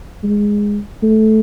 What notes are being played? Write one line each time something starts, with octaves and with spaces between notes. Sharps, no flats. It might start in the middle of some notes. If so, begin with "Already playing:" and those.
G#3
A3